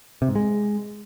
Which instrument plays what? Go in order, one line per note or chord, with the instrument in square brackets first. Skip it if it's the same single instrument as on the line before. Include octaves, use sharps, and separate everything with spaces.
[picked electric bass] C3
G#2
G#3